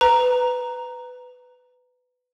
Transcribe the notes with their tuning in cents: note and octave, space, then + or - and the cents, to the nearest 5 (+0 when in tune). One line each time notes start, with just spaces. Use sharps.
B4 +15 A#5 +0